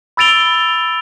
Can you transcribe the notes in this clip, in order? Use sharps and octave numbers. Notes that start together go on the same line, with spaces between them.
B5 E6 A6 D7 F7 G7